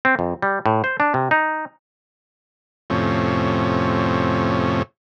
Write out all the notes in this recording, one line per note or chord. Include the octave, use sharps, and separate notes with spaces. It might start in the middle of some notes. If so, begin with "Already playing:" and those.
C4
F2
G3
A2
C5
D4
C3
D#4
F2 A2 C3 C#4